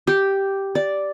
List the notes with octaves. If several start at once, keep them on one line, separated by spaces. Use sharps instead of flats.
G4
D5